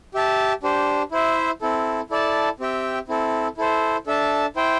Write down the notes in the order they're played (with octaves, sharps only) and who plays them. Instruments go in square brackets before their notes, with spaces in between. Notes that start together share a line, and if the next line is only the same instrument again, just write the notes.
[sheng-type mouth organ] G4 E5 A5
D4 G4 C5
E4 C5 E5
C4 E4 A4
E4 A4 D5 A5
C4 G4 E5 G5
C4 E4 A4
E4 A4 C5
D4 A4 E5 A5
E4 C5 G5